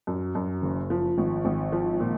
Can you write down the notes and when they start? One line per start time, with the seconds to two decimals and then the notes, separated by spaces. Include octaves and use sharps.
0.07 F#2
0.35 F#2
0.62 F#1
0.90 F3
1.18 G#1
1.45 G#1
1.72 F3
2.00 A#2